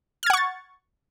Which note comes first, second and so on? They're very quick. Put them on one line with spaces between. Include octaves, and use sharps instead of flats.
F6 G#6 F#5 C#6 A6